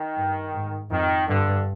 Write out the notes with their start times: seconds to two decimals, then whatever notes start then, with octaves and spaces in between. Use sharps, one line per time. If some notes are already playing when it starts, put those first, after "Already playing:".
Already playing: D#3
0.16 G2
0.53 G#2
0.90 F2 D#3
1.28 G2 D3